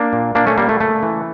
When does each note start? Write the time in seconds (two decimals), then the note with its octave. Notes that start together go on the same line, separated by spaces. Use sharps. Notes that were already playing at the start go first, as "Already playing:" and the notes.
Already playing: A#3 D4
0.13 A#2
0.35 A#2 A#3 D4
0.47 A3 C#4
0.58 A#2 G3 A#3
0.69 A3
0.80 C#3 A3
1.03 E3